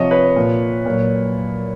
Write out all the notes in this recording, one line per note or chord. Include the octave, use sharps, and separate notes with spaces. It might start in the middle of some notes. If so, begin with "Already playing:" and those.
Already playing: C3 F3 C#5 D#5
B4 C#5
A#2 F3
A#2 F#3